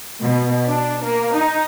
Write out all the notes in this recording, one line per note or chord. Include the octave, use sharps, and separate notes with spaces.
B2
D4
A#3
D#4